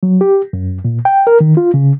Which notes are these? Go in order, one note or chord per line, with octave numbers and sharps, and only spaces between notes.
F#3
G4
F#2
A#2
G5
A#4
D#3
F4
C#3